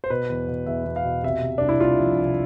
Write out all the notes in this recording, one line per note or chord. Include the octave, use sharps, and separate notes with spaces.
C5
B2 B4
E2
B2
E2 E5
E2
F5
B2
C3 E5
C3
C2 D4
E4
C2 F4
F3
C2